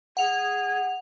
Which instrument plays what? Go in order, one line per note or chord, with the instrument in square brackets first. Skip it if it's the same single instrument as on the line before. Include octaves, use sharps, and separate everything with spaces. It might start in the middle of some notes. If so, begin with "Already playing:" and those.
[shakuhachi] G#4 [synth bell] F#5 F7